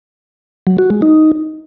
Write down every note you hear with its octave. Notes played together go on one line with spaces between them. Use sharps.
F#3
F#4
G#3
D#4